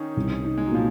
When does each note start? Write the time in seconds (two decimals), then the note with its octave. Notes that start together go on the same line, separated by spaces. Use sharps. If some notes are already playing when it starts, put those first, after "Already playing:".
Already playing: D#3 C#4 D#4
0.17 C2
0.44 D#4
0.58 G#3
0.66 F#3
0.72 A#2 F3